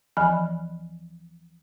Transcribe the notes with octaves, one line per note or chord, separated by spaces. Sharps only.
D2 E3 F3 G#5 B5 F6